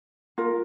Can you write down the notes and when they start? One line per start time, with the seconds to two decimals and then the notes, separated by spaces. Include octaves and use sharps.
0.38 F4 A#4